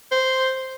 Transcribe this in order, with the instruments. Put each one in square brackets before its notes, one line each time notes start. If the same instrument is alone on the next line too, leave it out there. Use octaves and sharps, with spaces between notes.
[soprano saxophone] C5